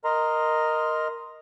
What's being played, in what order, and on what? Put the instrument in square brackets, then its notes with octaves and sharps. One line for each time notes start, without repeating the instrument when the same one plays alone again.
[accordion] A#4 D#5 A#5 C6